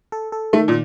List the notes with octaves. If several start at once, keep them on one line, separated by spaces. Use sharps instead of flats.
A4
A4
D#3 A3
A#2